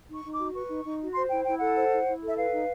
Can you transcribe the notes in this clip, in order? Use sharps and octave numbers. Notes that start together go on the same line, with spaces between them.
D#4 C#6
D#4
F#4 D6
B4 C#6
D#4
D#4
F#4
C5 C6
E4 G5
E4 G5
A4 F#5
C5
E4
E4
A4
E5
B4 F5
D#4